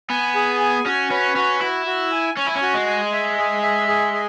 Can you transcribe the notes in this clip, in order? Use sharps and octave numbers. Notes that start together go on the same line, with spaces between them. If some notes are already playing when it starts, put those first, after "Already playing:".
B3 G#5
G#4
G#5
C#4 F#4
C#4 B4
C#4 F#4
E4 F#4
F#4
G#5
C#4 G#5
E4
C#4
F#4
G#3
G#5
E5
G#4
E5
G#4
G#4